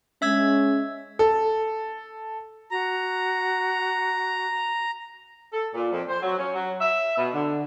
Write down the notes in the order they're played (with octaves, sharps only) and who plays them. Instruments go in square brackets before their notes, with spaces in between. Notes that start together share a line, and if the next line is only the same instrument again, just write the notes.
[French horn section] G#3 C#4 [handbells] E5 E6 G#6
[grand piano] A4
[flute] F#4 [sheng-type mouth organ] A#5
[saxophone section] A4
A#2
F2
C5
F#3
C#4
F#3
E5
B2
D3